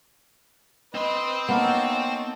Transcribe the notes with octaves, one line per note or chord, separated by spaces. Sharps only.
C4 B4 D#5 C6
A#3 B3 C#4 D#4 A5